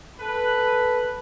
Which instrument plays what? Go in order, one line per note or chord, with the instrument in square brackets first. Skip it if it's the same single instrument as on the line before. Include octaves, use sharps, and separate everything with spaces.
[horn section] A4 B4